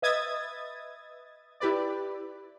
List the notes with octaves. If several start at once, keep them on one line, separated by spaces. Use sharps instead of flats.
B4 D#5 E5 D#6 G#6 A6
E4 G4 B4 D5